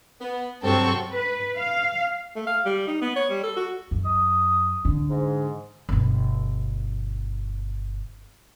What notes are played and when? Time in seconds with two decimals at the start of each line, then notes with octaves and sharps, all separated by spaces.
0.21 B3
0.63 G2 C3 F#3 C4 A4 C#6
1.12 B4
1.56 F5
2.36 A3
2.47 F5
2.66 G3
2.87 D#4
3.01 B3
3.16 C#5
3.30 G3
3.43 A4
3.57 F#4
3.91 F#2
4.04 D#6
4.85 D3
5.10 G#2
5.89 G1 B2